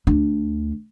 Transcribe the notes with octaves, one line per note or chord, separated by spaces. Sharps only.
D2 D4